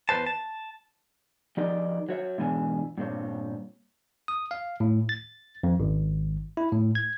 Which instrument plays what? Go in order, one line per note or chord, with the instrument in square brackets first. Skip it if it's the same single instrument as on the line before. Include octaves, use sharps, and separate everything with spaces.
[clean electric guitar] E2 E3 B4 C5 A5
A5
[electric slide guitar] F3 D#4 G4 A#4 D5 D#5
F#3 C#5 E5
G#2 B2 E3 D4 G#5
G2 A#2 C4 C#5
[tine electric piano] D#6
F5
A2
A6
F2
G#1
E4
A2
G#6